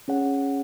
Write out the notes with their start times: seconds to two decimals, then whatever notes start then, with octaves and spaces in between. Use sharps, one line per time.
0.08 C#4 G#4 C#5 F#5